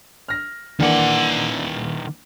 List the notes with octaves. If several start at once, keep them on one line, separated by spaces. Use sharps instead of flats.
F6 A#6
D#3 E3 A#3 D4 F#5